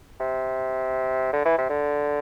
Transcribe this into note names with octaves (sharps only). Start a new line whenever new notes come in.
C3
D3
E3
C3
D3